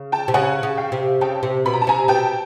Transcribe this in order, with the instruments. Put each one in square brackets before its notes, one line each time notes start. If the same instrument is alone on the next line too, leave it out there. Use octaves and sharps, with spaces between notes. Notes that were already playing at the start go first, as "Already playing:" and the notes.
Already playing: [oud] C#3
[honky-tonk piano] G5 A5
[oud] C3
[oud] C#3 [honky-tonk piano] F#5 G#5
[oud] C#3
[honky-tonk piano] F5 G5
[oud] C3
[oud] C#3 [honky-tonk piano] G5 A5
[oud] C3
[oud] B2 [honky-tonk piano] B5
[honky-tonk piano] A#5
A5
[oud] C3 [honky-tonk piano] G#5 A#5
[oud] B2 [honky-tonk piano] G5 A5